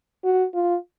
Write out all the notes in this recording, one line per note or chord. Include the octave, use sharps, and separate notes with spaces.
F#4
F4